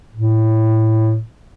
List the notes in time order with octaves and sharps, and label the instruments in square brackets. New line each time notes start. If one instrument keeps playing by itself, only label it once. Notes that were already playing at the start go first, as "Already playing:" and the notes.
[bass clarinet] A2